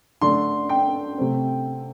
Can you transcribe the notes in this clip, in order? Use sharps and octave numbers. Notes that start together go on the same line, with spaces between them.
D3 A3 D4 C6
G5
C3 A3 C4